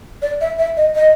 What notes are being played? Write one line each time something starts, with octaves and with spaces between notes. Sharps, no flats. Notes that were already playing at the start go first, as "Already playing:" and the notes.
D5
E5
E5
D#5
D#5